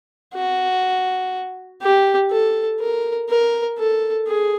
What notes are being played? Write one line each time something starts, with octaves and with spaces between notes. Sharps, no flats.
F#4
G4
A4
A#4
A#4
A4
G#4